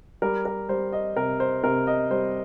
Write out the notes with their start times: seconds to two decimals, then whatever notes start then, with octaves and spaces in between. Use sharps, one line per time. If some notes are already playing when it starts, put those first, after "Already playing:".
0.22 G3 A#4
0.45 A#4
0.69 G3 C5
0.93 D#5
1.16 C3 A#4
1.40 C5
1.64 C3 A#4
1.87 D#5
2.10 G3 C5